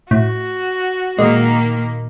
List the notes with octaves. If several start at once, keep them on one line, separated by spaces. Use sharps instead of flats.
A2 F#4
A#2 D#3 G#3 A#3